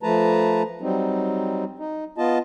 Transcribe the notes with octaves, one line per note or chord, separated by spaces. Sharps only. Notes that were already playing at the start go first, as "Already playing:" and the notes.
F3 A3 B4 A5 A#5
F#3 G3 C4 D#4
D#4
B3 F4 D#5 A5